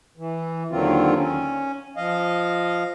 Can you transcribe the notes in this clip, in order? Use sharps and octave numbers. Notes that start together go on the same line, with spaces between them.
E3
D#2 D3 D#3 F#3 C4 F4
C#4
F3 D#5 F5